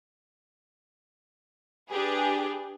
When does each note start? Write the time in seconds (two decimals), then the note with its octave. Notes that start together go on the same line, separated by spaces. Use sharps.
1.90 D4 G4 G#4 B4